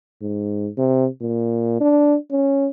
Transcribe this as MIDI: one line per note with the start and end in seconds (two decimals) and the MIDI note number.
0.22 0.69 44
0.78 1.07 48
1.22 1.80 46
1.81 2.16 62
2.32 2.69 61